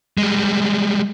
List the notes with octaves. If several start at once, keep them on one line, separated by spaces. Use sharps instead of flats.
G3 G#3